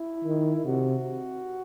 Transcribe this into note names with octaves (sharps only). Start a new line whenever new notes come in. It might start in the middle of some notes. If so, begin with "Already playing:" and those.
Already playing: E4
D#3
C3 F#4